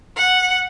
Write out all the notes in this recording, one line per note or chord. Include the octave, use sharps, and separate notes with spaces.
F#5